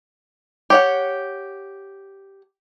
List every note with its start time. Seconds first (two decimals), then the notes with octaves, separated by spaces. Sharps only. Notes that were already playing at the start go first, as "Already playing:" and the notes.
0.70 G4 C#5 F#5